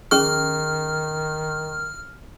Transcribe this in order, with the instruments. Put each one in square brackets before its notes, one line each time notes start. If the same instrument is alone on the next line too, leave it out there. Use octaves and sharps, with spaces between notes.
[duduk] D#3 [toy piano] C#4 G#4 C#6 [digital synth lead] F6